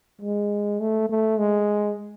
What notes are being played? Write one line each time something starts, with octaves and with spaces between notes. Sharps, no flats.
G#3
A3
A3
G#3